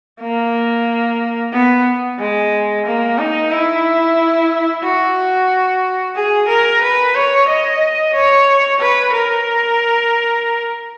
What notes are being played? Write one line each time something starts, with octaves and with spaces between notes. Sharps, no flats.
A#3
B3
G#3
A#3
D#4
E4
F#4
G#4
A#4
B4
C#5
D#5
C#5
B4
A#4